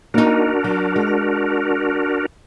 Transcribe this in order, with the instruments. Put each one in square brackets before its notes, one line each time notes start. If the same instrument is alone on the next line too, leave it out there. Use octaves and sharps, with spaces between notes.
[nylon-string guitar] A#3 D#4 [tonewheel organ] D4 F#4 A#4
[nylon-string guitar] F#3
G#3